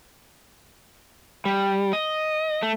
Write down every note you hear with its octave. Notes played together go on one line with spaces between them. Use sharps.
G3
D#5
A3